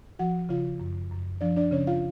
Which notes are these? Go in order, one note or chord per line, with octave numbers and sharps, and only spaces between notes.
F3 F#4 F#5
C#3 F4 F5
F#2
F#2
F3 D4 D5
D4 D5
C#3 C#4 C#5
F4 F5